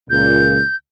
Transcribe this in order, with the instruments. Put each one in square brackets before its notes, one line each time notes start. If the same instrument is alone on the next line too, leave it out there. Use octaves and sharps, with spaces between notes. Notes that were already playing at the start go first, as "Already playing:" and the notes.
[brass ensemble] C#2 A#2 [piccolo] G6